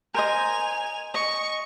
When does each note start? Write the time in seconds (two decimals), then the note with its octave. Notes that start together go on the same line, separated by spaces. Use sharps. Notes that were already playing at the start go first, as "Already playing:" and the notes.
0.14 A#4 C5 D#5 G#5 F7
1.14 D#5 C#6